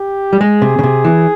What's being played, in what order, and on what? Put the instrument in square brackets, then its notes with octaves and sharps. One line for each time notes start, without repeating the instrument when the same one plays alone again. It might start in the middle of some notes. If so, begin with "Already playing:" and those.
Already playing: [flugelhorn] G4
[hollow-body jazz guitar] G3
[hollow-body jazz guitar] G#3 [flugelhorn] G#4
[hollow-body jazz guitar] C3
C#3
C3
E3